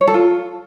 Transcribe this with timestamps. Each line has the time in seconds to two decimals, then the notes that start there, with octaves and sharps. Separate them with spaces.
0.01 C#5
0.08 A4
0.14 F4